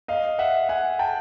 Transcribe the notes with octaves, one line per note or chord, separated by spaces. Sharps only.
D#5 F5
E5 F#5
F#5 G#5
G5 A5